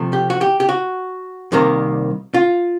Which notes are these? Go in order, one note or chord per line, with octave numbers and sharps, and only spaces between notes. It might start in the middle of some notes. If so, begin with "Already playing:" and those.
Already playing: C3 F3 A3
G4
F#4
G4
G4
F#4
C2 C3 D#3 G3 A#3
F4